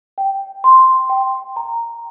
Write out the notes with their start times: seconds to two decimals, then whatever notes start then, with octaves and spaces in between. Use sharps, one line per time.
0.18 G5
0.64 C6
1.10 G5
1.56 A#5